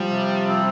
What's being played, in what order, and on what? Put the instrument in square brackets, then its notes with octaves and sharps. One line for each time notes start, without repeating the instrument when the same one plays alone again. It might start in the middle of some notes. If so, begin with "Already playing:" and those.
Already playing: [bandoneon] F3 [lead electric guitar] G3
[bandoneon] C3
C4